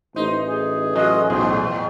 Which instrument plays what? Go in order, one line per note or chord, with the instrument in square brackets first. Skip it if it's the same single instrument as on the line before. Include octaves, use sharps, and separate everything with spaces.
[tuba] A1 [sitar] D#4 [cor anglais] C5
[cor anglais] G#4
[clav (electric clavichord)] F#3 F4 [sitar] G#3 [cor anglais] D#5
[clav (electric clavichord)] B1 G#4 [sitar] E2 A2 [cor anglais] C5